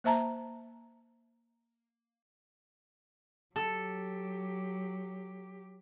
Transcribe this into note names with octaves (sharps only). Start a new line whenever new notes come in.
A#3 C5 E5 A5 A#5
F#3 G4 A4